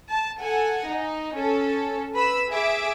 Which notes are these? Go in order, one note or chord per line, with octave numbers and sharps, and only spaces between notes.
A5
A4 F#5 G#5
D#4
C#4 A4
B4 B5 E6
G#4 E5 D6